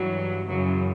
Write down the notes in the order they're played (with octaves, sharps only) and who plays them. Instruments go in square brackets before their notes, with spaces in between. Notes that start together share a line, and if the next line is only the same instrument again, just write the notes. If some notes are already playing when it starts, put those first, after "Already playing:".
Already playing: [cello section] G2 E3 F#3
F#2 C#3 E3 F#3